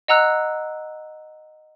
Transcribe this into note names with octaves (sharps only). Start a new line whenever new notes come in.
D#5 F#5 A#5 E6 F#6